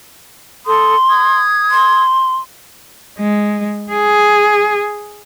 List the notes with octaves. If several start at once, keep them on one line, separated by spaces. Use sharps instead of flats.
A4 C6 D#6
D#6 G#6
C6
G#3
G#4